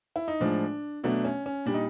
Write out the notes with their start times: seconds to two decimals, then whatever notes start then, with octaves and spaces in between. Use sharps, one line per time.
0.16 E4
0.28 D#4
0.40 A2 F3 G#3 D4
1.04 B2 F#3 A3 D4
1.25 C#4
1.46 C#4
1.66 A#2 G3 D4
1.74 D#4